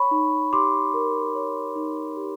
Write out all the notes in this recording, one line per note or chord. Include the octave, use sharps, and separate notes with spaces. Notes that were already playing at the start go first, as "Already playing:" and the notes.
Already playing: C#5 B5 C#6
D#4
G4 C6 D6
A#4
C#5
D#4
G4